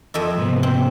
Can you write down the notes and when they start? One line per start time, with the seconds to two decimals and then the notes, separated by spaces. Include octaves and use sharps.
0.14 F2 D#5 E5
0.37 G#2 C3 B3
0.63 C4